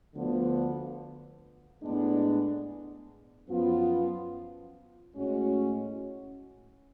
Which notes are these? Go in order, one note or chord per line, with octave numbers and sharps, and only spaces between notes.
D2 D3 F3 B3
A2 G#3 B3 D4
F#2 F3 B3 F4
A2 G#3 C#4 F#4